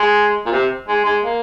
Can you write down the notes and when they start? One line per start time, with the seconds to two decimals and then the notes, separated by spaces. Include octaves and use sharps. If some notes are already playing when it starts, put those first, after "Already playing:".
Already playing: G#3
0.46 A#2
0.52 C3
0.88 G#3
1.04 G#3
1.23 A#3